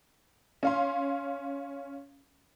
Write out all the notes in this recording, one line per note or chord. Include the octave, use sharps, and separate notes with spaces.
C#4 F5 C6